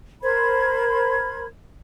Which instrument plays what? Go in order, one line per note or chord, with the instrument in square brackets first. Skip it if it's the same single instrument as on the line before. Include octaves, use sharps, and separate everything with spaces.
[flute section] A#4 C5 B5 G#6